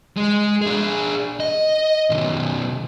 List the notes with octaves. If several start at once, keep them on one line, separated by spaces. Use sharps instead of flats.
G#3
D4 G#4
D#5
B2 D#3